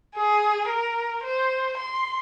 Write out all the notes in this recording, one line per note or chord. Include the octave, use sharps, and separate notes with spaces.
G#4
A#4
C5
C6